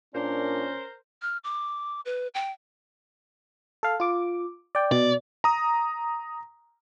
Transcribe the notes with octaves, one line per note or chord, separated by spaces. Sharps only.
A#2 C#4 D4 A#4 C5
F6
D6
B4
G5
A4 F5
F4 D6
D5 G5
B2 D5
A#5 D#6